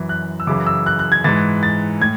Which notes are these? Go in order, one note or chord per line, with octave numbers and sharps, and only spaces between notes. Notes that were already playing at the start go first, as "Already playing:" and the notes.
Already playing: F#2 E3
F#6
E6
F#2 C#3 E3 D6
E6
F#6
F#6
G#6
G#2 E3 A6
A6
A2 G#6